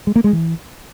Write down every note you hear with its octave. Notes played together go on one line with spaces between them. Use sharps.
G#3
A#3
G#3
E3